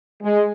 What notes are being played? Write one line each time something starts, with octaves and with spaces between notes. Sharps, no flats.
G#3